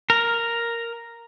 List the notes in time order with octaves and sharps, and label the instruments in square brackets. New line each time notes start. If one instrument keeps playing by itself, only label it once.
[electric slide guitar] A#4